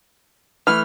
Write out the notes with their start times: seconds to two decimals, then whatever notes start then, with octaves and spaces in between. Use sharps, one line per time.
0.67 E3 A3 F6